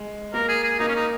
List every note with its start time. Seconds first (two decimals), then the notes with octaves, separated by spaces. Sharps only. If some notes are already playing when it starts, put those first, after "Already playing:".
Already playing: G#3
0.34 A#3 A#4
0.49 G#4
0.64 G#4
0.79 A#3 D#4
0.88 C#4
0.95 D#4